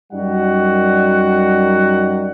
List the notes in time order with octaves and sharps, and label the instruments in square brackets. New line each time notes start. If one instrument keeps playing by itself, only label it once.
[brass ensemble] F#2 G3 D#4 F#4 F#5